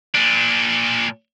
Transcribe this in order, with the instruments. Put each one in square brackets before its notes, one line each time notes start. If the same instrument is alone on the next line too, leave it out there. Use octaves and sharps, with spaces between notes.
[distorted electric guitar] A#2 D4